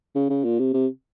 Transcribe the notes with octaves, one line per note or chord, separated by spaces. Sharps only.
C#3
C#3
A#2
C3
C3